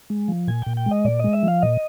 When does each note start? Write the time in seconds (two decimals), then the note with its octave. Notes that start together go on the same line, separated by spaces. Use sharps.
0.10 G#3
0.28 F3
0.48 A#2 G#5
0.62 A#2 G5
0.77 G5
0.86 G#3
0.91 D#5
1.05 A#2 D5
1.19 G#3 D#5
1.33 E5
1.43 F3 F5
1.62 A#2 D#5